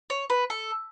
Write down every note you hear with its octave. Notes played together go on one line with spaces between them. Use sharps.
C#5
B4
A4